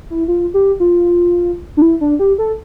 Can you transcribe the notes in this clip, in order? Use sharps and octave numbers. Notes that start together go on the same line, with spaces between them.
E4
F4
G4
F4
D4
E4
D4
G4
A4